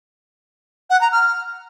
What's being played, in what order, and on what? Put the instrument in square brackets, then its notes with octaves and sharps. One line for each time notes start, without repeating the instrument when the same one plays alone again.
[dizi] F#5
A#5
F6